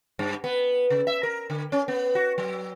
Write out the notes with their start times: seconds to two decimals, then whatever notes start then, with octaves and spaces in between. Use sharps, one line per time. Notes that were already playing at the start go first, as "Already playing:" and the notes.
0.19 G2
0.44 B3
0.90 C#3
1.07 E5
1.23 A#4
1.50 D3
1.72 C#4
1.88 B3
2.15 F#4
2.38 F#3